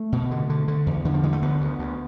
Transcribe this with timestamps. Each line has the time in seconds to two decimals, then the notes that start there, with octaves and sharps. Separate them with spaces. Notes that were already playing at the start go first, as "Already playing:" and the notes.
Already playing: A3
0.12 B2
0.31 D3
0.50 D3
0.68 D3
0.86 E2
1.05 D3 E3
1.14 F3
1.23 D3 G#3
1.33 A3
1.42 D2 B3
1.61 D2
1.79 D2